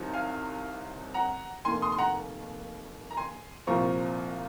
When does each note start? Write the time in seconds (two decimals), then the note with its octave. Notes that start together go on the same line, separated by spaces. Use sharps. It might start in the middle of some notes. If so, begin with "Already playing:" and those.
Already playing: C2 C3 D#3 F#3 C4
0.14 F5 G#5
1.14 F#5 A#5
1.65 F1 D#2 D#3 A#3 G#5 C6
1.82 C6 D#6
1.92 C6
1.98 F#5 A#5
3.11 A#5
3.17 G#5 C6
3.67 C2 A#2 F3 C4 A#5 C#6